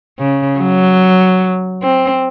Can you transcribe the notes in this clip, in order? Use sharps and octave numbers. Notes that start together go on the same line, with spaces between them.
C#3
F#3
C4